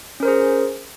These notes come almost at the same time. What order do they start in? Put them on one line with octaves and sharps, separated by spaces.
C#4 A#4 C5 G#4